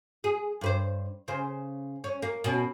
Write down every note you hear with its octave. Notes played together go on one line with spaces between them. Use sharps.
G#4
G2 B4 C5
C#3 C5
C#4
A#3
B2 C#4